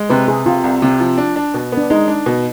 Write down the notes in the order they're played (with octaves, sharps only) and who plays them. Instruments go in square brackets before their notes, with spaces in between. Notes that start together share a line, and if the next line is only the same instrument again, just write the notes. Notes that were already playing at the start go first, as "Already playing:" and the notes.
Already playing: [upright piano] G#3
[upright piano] C3 [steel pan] B4
[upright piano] C3 [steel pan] G#4
[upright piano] C3 [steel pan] F4
[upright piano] C2
C3
F3
D4
D4
B2
B3
[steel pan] D4
[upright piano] G#3 [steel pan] D#4
[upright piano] D4
B2